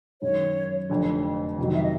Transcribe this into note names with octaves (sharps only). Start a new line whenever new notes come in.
F#2 D#3 G#3 C#5
F1 F2 D3
F2 C3 D#3 F#3
E5
D#5